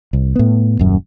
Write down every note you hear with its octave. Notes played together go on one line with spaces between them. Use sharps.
C2
A2 B3
D#1 F#2